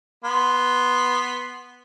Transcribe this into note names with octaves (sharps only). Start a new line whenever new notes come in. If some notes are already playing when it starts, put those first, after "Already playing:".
B3 C6